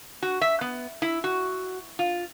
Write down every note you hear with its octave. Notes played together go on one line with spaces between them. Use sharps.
F#4
E5
B3
E4
F#4
F4